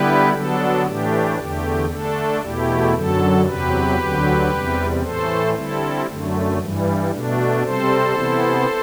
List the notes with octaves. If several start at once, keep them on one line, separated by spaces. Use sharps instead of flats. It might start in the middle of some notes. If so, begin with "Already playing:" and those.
Already playing: D3 G3 B3 E4 G4 B4
D3 F#3 B3 D4 A4
A2 E3 A3 D4 G4
E2 D3 A3 G4
D3 A3 D4 A4
E2 B2 A3 E4 G4
F#2 D3 F#3 A4
E2 C3 F#3 G4 B4
D2 D3 F#3
E2 C3 G3
A2 E3 A3 A4 C5
D3 G3 C4 E4 A4
F#2 D3 A3
G2 E3 G3
B2 A3 D4
C3 G3 C4 A4 C5
C3 E3 B3 E4